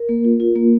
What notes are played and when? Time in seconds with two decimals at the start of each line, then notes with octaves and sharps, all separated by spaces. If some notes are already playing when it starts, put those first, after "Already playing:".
Already playing: A#4
0.09 A#3
0.24 F4
0.40 F4
0.56 A#3